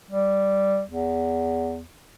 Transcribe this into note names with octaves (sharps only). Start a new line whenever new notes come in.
G3
E2